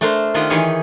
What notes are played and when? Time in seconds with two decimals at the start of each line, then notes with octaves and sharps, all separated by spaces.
0.01 A3 D4 A#4 C5
0.34 D#3 D4 F4 G4 D#5
0.50 D#3 E3 G4 G#4 C#5